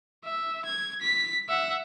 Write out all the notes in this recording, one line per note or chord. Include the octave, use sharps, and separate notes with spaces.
E5
G#6
B6
E5 F#5